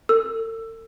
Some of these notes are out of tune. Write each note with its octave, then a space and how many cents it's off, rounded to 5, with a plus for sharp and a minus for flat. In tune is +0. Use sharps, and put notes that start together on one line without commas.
A4 +45 E6 +15